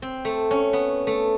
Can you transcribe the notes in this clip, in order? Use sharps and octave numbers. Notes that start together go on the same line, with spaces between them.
C4
A3
C#4
B3
A3